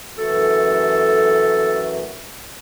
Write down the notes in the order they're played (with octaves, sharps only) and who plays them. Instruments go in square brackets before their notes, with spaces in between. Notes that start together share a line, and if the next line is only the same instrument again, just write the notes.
[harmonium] F#2 E3 A3 F#4 [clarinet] A4